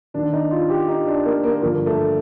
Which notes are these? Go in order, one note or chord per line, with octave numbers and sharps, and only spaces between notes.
D#2 D#3 D4
D#4
F4
G4
D#4
D4
A#3
A#3
G2 D3 F3 A#3
A3